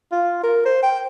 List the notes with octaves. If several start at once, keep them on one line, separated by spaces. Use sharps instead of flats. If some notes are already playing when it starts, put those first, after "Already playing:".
F4
A#4
C5
G5